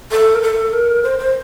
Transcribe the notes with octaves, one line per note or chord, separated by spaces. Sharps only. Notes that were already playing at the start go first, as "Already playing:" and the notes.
A4
A#4
A4
A#4
C5
C5